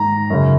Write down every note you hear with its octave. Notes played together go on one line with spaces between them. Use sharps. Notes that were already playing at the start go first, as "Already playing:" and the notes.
Already playing: G#2 D#3 A#5
F#2 C#3